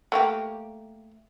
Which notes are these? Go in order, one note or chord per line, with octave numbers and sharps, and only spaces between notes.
A3 A#3 G4